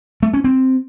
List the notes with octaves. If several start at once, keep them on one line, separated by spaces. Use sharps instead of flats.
A3
C#4
C4